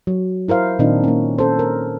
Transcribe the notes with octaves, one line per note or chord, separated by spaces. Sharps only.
F#3
E4 A#4 C5 F5
A#2 D#3 C4 D4 D#4 F4
A#3 C#4
C#4 A4 C5
A#4